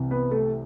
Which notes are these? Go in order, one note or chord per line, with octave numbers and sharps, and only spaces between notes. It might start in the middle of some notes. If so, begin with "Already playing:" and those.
Already playing: C2 C3 E3
B3 B4
A3 A4